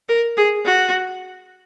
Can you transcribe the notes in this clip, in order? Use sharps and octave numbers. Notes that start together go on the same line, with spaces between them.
A#4
G#4
F#4